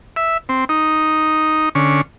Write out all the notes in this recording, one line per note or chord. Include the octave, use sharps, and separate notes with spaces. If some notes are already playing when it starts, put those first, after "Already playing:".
E5
C4
D#4
D3 C#4